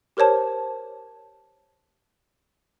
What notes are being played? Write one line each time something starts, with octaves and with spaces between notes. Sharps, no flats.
G4 A#4 C5 C#5 A5